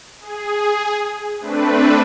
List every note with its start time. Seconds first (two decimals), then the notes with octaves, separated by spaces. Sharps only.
0.20 G#4
1.41 A3 C4 D4 B4